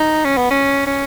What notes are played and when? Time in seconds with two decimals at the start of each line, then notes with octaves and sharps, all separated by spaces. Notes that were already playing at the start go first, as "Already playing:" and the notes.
Already playing: D#4
0.25 C#4
0.37 B3
0.51 C#4
0.87 C#4